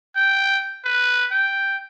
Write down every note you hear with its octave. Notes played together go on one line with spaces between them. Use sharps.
G5
B4
G5